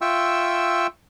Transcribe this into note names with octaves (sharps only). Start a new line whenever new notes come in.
F4 E5 G5 C#6 E6